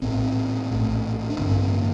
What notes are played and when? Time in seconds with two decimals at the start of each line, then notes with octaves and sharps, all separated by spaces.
0.02 A#1 A2 C4
0.71 A#1 A2
1.30 D4
1.38 A1 G2 D3 C4
1.62 A#3